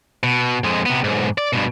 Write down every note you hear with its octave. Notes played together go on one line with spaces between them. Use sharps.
B2
F2 G#3
C3 B3
B1 G#2
D5
G2 B2